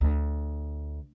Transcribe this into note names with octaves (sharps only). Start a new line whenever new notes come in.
D2